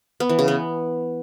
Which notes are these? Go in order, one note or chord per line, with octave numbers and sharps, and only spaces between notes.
B3
E3
C#3
B3